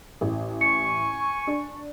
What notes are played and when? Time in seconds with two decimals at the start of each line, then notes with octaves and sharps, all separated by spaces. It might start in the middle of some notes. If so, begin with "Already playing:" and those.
0.21 A1
0.61 G#5 C#6 C#7
1.47 D4